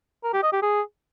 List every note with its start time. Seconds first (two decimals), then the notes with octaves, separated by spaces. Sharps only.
0.24 A#4
0.33 G4
0.43 D#5
0.53 G4
0.62 G#4